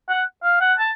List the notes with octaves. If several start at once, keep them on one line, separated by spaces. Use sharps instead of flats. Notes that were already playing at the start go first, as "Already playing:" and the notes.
F#5
F5
F#5
A5